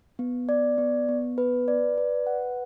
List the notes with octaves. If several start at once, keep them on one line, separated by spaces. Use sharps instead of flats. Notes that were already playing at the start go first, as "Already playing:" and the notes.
B3
D5
B3
B3
B4
D5
B4
F#5